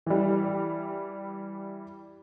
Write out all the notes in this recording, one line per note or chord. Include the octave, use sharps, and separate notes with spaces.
E3 G3